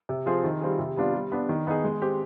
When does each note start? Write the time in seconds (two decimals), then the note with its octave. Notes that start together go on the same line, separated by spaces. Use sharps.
0.09 C3
0.26 F3 C4 F4 G#4
0.44 D#3
0.61 G3 C4 F4 G#4
0.79 C3
0.96 G3 B3 D4 F4
1.14 G3
1.32 B3 D4
1.49 D#3
1.67 B3 D#4 G#4
1.84 G#3
2.02 C4 G4